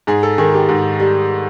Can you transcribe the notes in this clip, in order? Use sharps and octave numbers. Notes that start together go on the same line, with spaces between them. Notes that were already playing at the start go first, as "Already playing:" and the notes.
G#2 G#4
A4
D#3 G#4
G4
G#2
G3